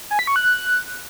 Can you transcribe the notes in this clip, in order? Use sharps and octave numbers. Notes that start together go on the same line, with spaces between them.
G#5
B6
C#6
F#6